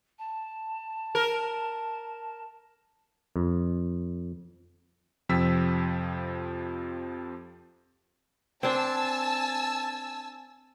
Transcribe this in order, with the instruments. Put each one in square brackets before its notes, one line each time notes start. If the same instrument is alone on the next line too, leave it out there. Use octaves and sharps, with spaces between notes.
[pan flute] A5
[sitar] A#4
[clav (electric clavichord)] F2
[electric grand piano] F2 C3 F3 G5 E6 B6
[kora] C4 D4 [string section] G#5 A5 E6